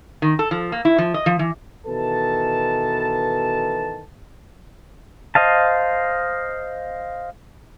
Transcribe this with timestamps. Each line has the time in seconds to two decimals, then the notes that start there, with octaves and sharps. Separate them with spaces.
0.22 D#3
0.39 A4
0.51 F3
0.72 A#3
0.85 E4
0.98 F3
1.14 D#5
1.26 F3
1.39 E3
1.86 B2 D#3 E3 A4 B4 A5
5.35 C5 D#5 F5 A5